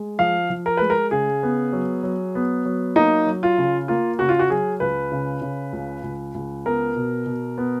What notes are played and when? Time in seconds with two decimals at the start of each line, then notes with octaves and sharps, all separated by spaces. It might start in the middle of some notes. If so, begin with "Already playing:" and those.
Already playing: G#3
0.19 F3 F5
0.50 F3
0.66 A#4
0.77 G#3 B4
0.90 A#4
1.11 C#3 G#4
1.43 B3
1.73 F#3
2.03 F#3
2.35 B3
2.65 F#3
2.96 A#3 D#4
3.26 F#3
3.43 F4
3.58 C#3
3.88 A#3 F4
4.19 C#3 F#4
4.29 F4
4.39 F#4
4.50 F#3 G#4
4.80 C#2 B4
5.12 C#3
5.42 C#3
5.73 C#2
6.04 C#2
6.34 C#2
6.66 B3 A#4
6.96 B2
7.26 B2
7.58 B3